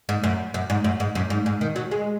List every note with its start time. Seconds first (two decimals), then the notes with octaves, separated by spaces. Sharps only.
0.09 G#2
0.24 F#2
0.54 F#2
0.70 G#2
0.84 F#2
1.00 G#2
1.15 F#2
1.30 G#2
1.46 G#2
1.61 D#3
1.76 F#3
1.91 G#3